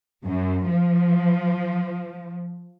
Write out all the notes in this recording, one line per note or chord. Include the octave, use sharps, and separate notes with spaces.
F#2
F3